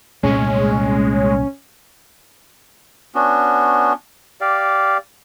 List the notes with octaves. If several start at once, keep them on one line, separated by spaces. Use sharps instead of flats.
C2 A#2 G#3 A3 C#4
B3 C#4 D4 F#4
G4 D5 F5